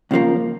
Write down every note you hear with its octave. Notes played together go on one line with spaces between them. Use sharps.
C#2 C#3 F3 A#3